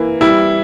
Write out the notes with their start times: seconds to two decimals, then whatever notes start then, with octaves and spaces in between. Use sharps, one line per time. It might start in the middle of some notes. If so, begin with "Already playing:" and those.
Already playing: E3 A#3
0.21 G3 E4